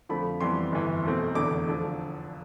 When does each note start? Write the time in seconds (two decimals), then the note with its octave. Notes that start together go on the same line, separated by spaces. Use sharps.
0.09 F2 D3 F3 A3 B5
0.41 F2 E3 G3 B3 C6
0.72 G1 F2 E3
1.04 B1 B2 A3 C4
1.35 F1 E2 D3 A3 D6
1.68 D3 F3